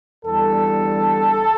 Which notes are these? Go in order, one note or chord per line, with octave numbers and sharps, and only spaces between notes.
E2 D3 G3 A4